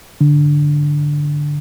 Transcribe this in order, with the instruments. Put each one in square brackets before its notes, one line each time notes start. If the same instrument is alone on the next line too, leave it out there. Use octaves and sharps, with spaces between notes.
[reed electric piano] D3